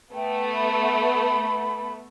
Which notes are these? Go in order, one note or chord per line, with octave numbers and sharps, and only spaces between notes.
A3 B3 G5
B5